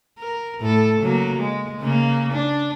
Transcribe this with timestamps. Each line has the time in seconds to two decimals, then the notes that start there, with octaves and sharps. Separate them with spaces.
0.19 A#4
0.60 A2 A4
1.00 C#3 F#3 A#3
1.37 G#3
1.80 C#3 A#3
2.32 D4